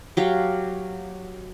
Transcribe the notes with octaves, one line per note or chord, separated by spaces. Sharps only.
F#3 G4 F5